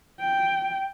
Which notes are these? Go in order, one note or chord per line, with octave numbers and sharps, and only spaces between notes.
G5